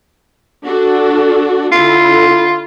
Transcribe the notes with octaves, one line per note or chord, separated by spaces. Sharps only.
D4 F#4 A4
D3 E4 F4